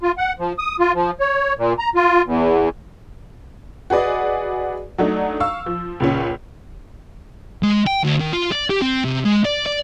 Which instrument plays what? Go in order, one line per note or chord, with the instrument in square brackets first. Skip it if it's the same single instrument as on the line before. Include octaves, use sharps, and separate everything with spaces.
[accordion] F4
F#5
F3
D#6
F4
F3
C#5
A#2
A#5
F4
E2
[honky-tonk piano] F#4 G#4 B4 D5 D#5
F#3 A3 D4 D#4
F5 C#6 E6
F3
C#2 A#2 C#4
[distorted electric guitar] G#3
G5
D2
D#3
F4
D5
G4
C4
C3
G#3
D5
D5